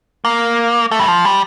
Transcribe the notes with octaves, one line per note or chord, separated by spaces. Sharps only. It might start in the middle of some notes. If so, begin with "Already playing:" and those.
A#3
A3
G3
F3
G3